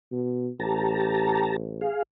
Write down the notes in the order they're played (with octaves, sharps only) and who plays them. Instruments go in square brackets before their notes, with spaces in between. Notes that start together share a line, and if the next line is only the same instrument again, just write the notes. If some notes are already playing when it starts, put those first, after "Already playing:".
[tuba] B2
[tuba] A1 [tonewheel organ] G4 A5 A#5
[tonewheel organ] G#4 F5